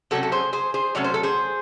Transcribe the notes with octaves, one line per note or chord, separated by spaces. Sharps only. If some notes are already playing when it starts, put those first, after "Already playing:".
C3 F#3 A3 C#4 F#4 A4
A4
G#4 C5
G#4 C5
G#4 C5
C3 F#3 A3 C#4 C#5
C5
A4
G#4 C5